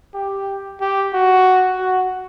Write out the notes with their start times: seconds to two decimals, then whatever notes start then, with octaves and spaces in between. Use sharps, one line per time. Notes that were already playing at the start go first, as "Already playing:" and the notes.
0.14 G4
0.81 G4
1.13 F#4
1.80 F#4